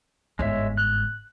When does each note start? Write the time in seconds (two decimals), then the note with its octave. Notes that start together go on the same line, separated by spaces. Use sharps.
0.39 G1 G#2 G#3 C#5 E5
0.77 F#6